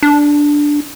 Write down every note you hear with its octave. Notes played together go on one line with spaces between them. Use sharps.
D4